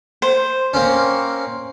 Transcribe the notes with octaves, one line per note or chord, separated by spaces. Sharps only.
C5
A#3 C4 C#4